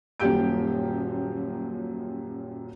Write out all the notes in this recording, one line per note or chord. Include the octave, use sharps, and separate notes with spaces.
D#1 F#2 A#2 G4 G6 D7